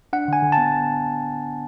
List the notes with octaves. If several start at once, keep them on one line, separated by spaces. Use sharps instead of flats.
D4 F#5
D3 G#5
D3
A5
B3